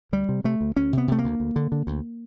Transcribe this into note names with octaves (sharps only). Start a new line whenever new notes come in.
D2 G3
C3
C3 A3
D2
D2 C#4
C3 B3
C3 A3
A#3
D2
D2
D3
D3
D2